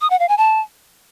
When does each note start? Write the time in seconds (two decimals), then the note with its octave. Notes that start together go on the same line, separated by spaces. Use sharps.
0.01 D#6
0.10 F#5
0.19 F5
0.29 G#5
0.38 A5